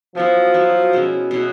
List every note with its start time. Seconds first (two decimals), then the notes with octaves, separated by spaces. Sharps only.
0.15 F3 F#3 B3 E4
0.54 F#3 B3 E4
0.93 B2 G#3 C#4 E4
1.31 B2 G#3 C#4 E4